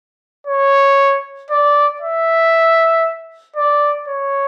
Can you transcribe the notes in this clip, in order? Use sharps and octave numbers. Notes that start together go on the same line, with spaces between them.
C#5
D5
E5
D5
C#5